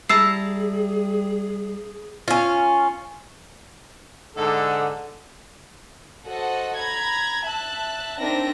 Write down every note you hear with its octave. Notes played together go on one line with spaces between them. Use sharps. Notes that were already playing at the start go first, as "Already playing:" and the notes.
G3 E4 G#4 A5 A#5 E6 C7
C#4 F4
G#2 D3 A4
F#4 A4 C5 D#5 F#5
A#5 B5 G#6
E5 A5 F#6
C4 D4 D#4 A#4 E5 A#6